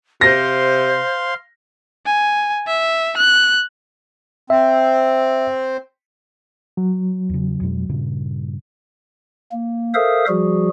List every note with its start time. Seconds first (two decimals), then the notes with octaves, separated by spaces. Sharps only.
0.21 C3 C5 F5 C6 A#6
2.06 G#5
2.67 E5
3.17 F#6
4.50 C4 E5
6.77 F#3
7.30 E2 C#3
7.61 F2 B2 G#3
7.89 G2 A#2 C#3
9.51 A#3
9.94 A4 A#4 C5 E5 F5 D#6
10.28 F3 G3 F#4 G#4